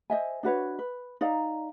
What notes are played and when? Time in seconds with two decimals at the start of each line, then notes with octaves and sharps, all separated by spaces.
0.10 C5 D#5 E5 G#5
0.43 D4 F#4 B4 C#5
0.79 B4
1.21 D#4 D5 F5 A#5